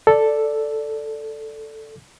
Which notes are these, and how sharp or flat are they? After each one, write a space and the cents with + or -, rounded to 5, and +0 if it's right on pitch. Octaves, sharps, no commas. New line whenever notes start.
A4 +0 D5 +0